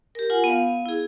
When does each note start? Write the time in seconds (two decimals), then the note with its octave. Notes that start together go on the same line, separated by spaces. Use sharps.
0.15 G4 A#4
0.30 F4 F#5 G#5
0.44 B3 F5
0.86 E4 G#4